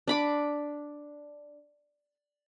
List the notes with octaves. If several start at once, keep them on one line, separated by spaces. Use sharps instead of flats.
D4 B5 D6